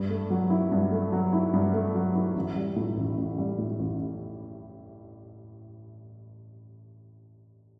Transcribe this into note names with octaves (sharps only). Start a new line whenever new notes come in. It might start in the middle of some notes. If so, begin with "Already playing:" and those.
Already playing: G2
A3
F#3
E4
G2
A3
F#3
E4
G2
A3
F#3
E4
A1
G3
A2
A1
A1
G3
A2
A1